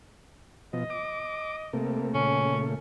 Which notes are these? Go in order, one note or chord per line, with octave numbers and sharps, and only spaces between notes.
B2 F3 D#5
D6
C3 A3 A#3
A#2 C#3 A3 C#4